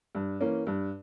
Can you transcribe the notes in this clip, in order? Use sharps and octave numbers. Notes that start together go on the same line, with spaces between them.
G2
E3 A#3 C#4
G2